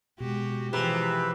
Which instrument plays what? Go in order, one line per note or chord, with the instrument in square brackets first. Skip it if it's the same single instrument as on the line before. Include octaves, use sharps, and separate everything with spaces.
[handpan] B2 [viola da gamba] G#3 F#4 G4
[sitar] C3 [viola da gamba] E3 F3 [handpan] G4 G#4 [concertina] B4